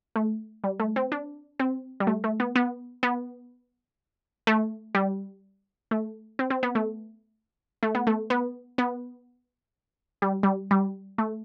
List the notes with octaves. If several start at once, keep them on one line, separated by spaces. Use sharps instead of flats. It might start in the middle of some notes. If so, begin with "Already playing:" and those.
A3
G3
A3
C4
D4
C4
G3
A3
A3
B3
B3
B3
A3
G3
A3
C4
C4
B3
A3
A3
B3
A3
B3
B3
G3
G3
G3
A3